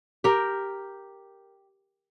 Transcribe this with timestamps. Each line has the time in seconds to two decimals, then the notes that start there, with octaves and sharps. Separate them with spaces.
0.24 G4 A#4